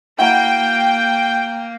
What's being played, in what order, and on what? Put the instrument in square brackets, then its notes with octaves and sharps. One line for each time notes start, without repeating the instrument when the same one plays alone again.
[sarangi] A#3 [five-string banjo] E4 F#4 A#5 [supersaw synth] G5